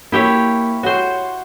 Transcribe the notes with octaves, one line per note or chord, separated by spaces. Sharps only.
A#3 E4 G4 C#5
F#4 C5 C#5